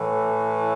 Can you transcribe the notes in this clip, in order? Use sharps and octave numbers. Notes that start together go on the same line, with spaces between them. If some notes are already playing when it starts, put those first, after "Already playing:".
Already playing: A2 E3